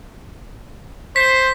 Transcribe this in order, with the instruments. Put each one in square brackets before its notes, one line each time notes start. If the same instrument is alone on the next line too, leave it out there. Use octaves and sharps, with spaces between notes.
[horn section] C5 [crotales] B6